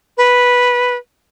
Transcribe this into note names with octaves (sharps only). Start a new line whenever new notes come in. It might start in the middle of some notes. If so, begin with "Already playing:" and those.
B4